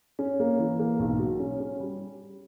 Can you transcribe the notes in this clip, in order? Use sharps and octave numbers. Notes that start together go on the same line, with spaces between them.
C#4
A#3
E3
A#3
B1
F#3
C#4
C#4
G3